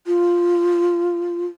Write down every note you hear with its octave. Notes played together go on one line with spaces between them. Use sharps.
F4